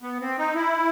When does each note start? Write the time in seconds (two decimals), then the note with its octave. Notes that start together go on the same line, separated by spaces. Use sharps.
0.02 B3
0.21 C4
0.38 D#4
0.55 E4